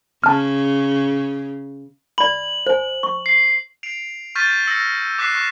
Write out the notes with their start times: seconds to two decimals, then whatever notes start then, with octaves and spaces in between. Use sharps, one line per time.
0.24 C#3 A5 F6
2.18 D5 B5 F#7
2.67 C5 G#5
3.03 C#6
3.26 C7
3.83 C7 D7 F7
4.35 C#6 F6 G6 A6 B6 D#7
4.67 E6 A#6 C#7
5.19 D6 F#6 G6 B6 C7 E7
5.35 C#6